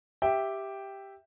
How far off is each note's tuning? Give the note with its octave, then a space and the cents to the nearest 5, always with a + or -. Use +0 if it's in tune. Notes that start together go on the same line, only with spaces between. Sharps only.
G4 +0 E5 +0 G5 +0